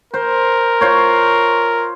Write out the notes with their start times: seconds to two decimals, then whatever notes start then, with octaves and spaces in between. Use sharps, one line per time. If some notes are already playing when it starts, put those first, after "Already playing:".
0.14 A#4 C5
0.81 F4 C5 C#5